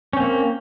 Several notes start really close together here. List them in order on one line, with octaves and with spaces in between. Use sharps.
C#4 C4 A#3